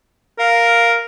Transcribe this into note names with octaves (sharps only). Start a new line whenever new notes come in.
A#4 F5